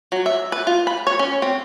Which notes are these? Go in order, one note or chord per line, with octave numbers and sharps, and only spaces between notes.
F#3
E5
B4
F4
B5
C#5
C#4
C4